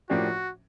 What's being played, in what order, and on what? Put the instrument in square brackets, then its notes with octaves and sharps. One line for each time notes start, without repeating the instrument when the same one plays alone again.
[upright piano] A2 F3 A#3 D4 G4 [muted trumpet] F#4